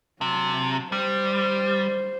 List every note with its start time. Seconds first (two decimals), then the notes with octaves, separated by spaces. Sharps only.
0.21 C3 F#3 A5
0.92 G3 C5